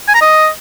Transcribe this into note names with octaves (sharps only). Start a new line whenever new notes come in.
G#5
A#5
D#5